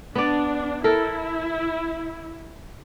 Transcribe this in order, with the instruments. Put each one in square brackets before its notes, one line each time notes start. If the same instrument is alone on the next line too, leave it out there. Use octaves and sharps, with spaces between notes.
[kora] B3 D5 [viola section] D4
[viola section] E4 [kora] A4 A#4